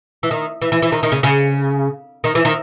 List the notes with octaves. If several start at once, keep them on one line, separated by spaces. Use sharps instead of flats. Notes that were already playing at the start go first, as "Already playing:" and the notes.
E3
D#3
E3
E3
E3
D#3
D#3
C#3
C#3
D#3
E3
D#3